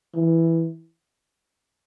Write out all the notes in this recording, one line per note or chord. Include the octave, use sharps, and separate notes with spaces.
E3